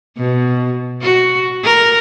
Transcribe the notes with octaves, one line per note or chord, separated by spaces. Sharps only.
B2
F#4
A#4